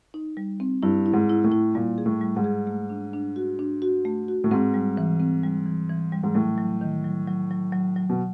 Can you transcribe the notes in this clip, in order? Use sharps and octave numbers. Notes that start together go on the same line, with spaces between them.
D#4
G3
C4
G2 E4
E4
G#2
E4
A2
E4
A#2 G3
G#4
A2
G3
G#2
G#4
A3
D4
D4
F#4
D4
F#4
A3
F#4
A2
G#2 C4
G3
E3
C4
G3
E3
E3
G3
G#2
A2 F#3
F#3
D#3
F#3
F#3
F#3
F#3
F#3
B2